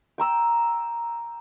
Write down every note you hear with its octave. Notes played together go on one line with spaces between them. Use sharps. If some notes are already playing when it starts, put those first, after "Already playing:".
G5 A#5 E6